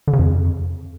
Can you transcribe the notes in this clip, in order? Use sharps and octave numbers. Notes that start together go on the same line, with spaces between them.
D3
C#3
F2